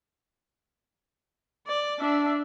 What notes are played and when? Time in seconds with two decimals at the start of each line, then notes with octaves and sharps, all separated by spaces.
1.67 D5
2.00 D4 E5